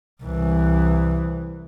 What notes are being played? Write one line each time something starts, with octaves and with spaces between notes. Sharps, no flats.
C2 E3